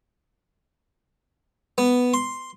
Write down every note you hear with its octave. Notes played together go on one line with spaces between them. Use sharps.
B3
C6